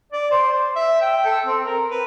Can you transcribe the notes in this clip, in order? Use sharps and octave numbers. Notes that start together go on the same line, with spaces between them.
D5
C5
C5
E5
G5
A4
C4
A#4
B4